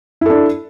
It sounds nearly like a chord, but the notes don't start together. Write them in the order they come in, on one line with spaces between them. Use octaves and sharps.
E4 A4 D4